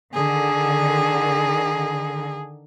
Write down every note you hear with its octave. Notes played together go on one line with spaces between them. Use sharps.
D3 D#3 G#4